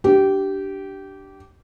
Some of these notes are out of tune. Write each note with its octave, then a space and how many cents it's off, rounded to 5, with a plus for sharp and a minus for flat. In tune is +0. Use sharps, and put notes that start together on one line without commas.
D4 +0 G4 -20